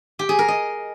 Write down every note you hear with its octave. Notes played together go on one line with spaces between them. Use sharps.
G4
G#4
A#4
D#5